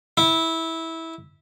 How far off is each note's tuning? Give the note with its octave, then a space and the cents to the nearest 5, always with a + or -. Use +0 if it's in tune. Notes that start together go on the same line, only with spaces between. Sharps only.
E4 -15